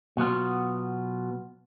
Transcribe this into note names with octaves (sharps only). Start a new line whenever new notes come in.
B2 F#3 B3 F4